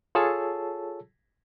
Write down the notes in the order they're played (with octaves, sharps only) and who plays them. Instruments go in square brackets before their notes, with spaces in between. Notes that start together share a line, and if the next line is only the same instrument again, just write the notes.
[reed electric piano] F4 G#4 A4 C#5 A5 E6